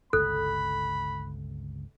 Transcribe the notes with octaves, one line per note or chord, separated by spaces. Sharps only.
G1 C#2 C3 A4 B5 F#6